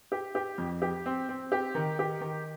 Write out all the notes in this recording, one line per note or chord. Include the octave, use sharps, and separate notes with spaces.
G4
G4
F2
G4
C4
C4
G4
D#3
G4
D#3